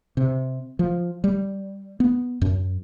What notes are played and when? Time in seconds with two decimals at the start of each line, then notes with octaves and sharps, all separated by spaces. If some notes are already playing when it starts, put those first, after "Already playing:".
0.17 C3
0.79 F3
1.24 G3
2.00 B3
2.42 F#2